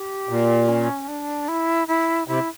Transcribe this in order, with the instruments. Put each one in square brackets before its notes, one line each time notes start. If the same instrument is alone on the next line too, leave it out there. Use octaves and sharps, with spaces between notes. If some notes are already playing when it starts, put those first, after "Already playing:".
Already playing: [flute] G4
[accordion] A#2
[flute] C#4
D4
E4
E4
[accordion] C3 [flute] E4